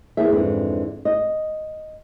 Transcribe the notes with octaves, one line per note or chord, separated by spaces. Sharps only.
D#2 E3 A#3 B3 G#4 E5
F2 G#2 D3 E3
D#5